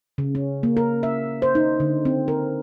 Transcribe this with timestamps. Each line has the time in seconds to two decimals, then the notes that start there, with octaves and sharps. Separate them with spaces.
0.18 C#3
0.35 C#4
0.63 A#3
0.77 A#4
1.03 E5
1.42 C5
1.55 D#4
1.80 D3
2.05 C4
2.28 A#4